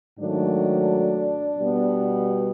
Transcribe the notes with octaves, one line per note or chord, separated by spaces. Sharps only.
G#2 D#3 F#3 A3 D4
B2 G3 B3